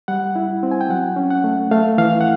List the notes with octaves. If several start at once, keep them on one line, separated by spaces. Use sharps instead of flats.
G3 F#5
E4
C4
G#5
G5
F#3 F#5
C#4
F#5
A3
A3 F5
E3 F5
F#5